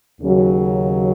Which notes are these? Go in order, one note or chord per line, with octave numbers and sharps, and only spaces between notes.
D#2 C#3 F#3